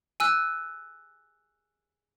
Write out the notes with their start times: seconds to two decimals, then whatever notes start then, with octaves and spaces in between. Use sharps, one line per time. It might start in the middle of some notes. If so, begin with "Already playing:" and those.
0.20 G#5 E6 F#6